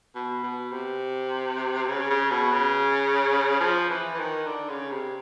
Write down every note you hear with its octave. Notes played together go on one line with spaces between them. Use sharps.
B2
B2
C3
C#3
C#3
B2
C#3
F3
E3
E3
D#3
D3
C#3
C3